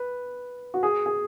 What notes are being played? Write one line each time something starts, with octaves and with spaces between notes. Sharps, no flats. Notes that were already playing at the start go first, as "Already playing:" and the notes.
Already playing: B4
F#4
G#4
G#4